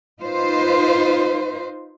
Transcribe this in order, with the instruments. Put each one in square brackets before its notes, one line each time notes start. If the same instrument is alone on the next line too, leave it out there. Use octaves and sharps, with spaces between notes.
[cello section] D#4 F4 B4 C5